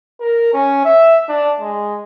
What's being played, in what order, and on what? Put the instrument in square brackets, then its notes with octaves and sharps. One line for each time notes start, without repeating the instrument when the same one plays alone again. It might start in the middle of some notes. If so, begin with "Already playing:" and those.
[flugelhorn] A#4
C#4
E5
D4
G#3